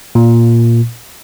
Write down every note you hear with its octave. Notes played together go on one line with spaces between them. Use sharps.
A#2